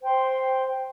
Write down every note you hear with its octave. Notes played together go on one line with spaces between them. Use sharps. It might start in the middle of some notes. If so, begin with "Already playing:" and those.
C5 G5 C6